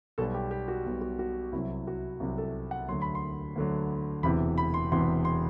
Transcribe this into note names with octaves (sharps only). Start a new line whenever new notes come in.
B1 B2 G3 A4
G4
G4
F#4
B1 B2 G3
F#4
F#4
C2 C3 F#3 E4
F#4
C2 C3 F#3
A4
F#5
D2 D3 F#3 C6
B5
C6
D2 D3 F#3
E1 E2 C3 E3 B5
B5
C6
E1 E2 C3 E3 C6
C6